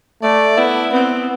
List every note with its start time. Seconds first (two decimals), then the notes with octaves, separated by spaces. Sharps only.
0.23 A3 D5
0.57 B3 E4
0.93 B3 C4